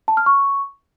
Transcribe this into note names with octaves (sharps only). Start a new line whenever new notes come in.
A5
F6
C#6